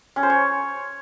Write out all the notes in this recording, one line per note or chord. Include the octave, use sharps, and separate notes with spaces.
C#4
C5
C#5